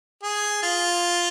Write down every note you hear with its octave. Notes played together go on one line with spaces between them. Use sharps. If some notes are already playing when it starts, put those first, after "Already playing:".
G#4
F4